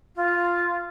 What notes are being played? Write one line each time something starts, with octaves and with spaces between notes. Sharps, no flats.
F4